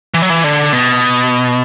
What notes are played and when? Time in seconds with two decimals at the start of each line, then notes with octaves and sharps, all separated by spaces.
0.14 E3
0.22 F#3
0.30 E3
0.44 D3
0.73 B2